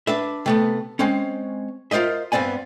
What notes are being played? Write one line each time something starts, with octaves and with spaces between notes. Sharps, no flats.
D4 B4 E5
C3 A3 B3
G#3 C4 C#4
F4 A#4 C5 D#5 E5
G2 B3 C4 D5 G#5